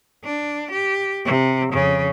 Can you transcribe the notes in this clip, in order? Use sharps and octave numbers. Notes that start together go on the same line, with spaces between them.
D4
G4
C3
F2 C#3